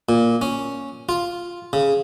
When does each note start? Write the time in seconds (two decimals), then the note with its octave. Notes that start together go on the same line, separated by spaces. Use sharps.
0.09 A#2
0.42 C#4
1.09 F4
1.73 C#3